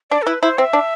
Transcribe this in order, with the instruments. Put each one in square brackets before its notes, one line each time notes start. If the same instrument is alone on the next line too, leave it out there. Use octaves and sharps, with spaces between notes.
[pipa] D4 [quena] D5
[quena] A4
[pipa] E4 [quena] B4
[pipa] E4 [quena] C5
[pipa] C4 [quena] E5
[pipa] D4